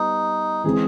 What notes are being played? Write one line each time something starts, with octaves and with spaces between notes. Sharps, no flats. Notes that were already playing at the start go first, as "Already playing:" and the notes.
Already playing: G3 B3 D#4
E3 G#3 C4 G#4